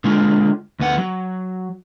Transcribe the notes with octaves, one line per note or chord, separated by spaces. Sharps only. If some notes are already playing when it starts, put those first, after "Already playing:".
D3 G#3 F4
D2 B3 F#5
F#3